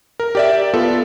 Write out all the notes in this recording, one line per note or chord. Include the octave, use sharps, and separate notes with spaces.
A#4
G4 D5 E5
B3 F4 A4